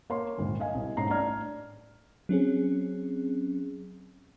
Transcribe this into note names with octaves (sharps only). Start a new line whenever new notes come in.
A#3 C#5 C6
D#1 G#1 D3
D#5 F5 G#5
C2
G#2 C#4 A#5 C7
A1 D4 D5 A#5 F6 G#6
F#3 C4 C#4 G#4